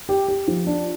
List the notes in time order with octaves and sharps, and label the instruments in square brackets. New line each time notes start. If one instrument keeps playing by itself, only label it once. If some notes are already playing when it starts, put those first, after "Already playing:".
[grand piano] G4
G4
F3
D4